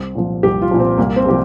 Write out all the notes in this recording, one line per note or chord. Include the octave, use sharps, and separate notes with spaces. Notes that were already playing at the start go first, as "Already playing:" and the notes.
Already playing: C2 C4
A#2 F3
C2 G4
F4
A#2 F3
C4
C2 A#3
C4
C3 F3 G4